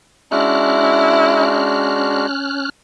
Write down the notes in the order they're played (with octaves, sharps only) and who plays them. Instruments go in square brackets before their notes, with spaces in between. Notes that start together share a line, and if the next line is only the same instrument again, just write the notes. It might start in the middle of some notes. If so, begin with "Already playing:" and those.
[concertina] G#3 D4 F#4 [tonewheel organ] C#4 F6 F#6 [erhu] E4